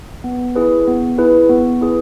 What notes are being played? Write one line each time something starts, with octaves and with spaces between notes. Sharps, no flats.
B3
E4 G#4 B4
B3
E4 G#4 B4
B3
E4 G#4 B4